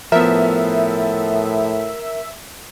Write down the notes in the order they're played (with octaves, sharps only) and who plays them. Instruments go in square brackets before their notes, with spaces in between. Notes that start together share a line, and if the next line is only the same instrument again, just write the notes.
[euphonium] A2 [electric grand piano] F3 B3 [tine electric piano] A#4 [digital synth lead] E5